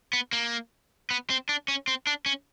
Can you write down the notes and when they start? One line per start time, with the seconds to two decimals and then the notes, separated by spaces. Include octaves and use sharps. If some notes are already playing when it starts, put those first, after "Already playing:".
0.13 B3
0.33 A#3
1.10 B3
1.30 C4
1.49 D4
1.68 C#4
1.88 C4
2.07 D4
2.26 C#4